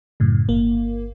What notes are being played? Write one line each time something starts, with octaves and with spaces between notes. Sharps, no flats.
F#2 A2 C#3
G1 A#3